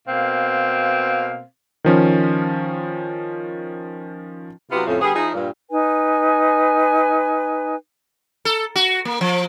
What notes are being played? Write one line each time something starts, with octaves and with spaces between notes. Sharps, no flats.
B2 A#3 C4 F5
D#3 F3 C#4
C3 F#3 B3 E4 F4 G4
F2 A2 C#3
D3 G3 B3 G#4
F3 D#4 E4 G#4
G2 A#2
D#4 B4 G#5
A4
F#4
A#3
F3